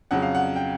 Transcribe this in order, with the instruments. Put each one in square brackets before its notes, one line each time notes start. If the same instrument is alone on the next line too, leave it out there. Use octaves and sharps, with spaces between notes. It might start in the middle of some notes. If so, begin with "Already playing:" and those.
[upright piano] F2 C#3 F#3 F#5
F5
F#5
G5